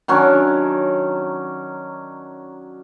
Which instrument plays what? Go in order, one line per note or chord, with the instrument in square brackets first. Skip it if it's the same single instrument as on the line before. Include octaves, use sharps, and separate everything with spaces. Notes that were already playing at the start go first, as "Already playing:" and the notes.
[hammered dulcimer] D#3 F#3 C#4 D4